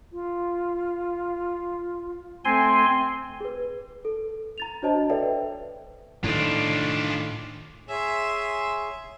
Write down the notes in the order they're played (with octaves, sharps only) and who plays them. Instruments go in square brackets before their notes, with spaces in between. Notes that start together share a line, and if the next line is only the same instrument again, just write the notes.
[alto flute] F4
[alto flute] A3 [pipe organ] C4 G#5 C6
[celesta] G#4 B4
A4
A#5 A6 F7
D4 F#4 C5 C#5 D#5 A5
A4 B4 C#5 D5 E5 G5
[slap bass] A2 D#3 [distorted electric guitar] D4 F4
[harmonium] G#4 C#5 G#5 [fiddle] E5 C6